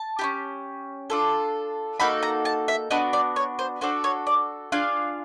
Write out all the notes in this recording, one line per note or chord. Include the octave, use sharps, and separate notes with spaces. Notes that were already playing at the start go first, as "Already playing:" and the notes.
Already playing: A5
C#4 E4 G4
D4 F4 A4
A#3 D#4 F#4 A4 B5
A#5
A5
E5
B3 D4 F#4 D#5
D5
C#5
C5
D4 F#4 A4 C5
C#5
D5
D4 F4 G#4 F5